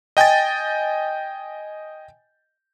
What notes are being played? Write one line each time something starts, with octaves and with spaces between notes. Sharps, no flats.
D#5 G5 G#5 G6 A6